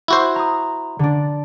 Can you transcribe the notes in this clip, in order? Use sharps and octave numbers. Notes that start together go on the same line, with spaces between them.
E4 F#4 C5
A#5 D#6
D3 D4